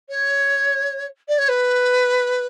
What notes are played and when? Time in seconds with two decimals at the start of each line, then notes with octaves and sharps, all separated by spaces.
0.09 C#5
1.28 D5
1.38 C#5
1.48 B4